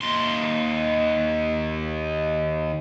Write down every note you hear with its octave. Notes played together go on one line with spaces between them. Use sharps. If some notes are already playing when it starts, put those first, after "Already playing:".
D#2 C6